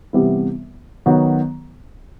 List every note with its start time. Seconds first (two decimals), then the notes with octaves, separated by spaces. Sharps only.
0.13 C3 E3 G3 B3 E4
1.06 D#3 F#3 B3 F#4